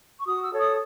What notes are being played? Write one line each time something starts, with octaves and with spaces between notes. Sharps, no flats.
C#6
F#4 D#6
E6
A4 C#5
D#6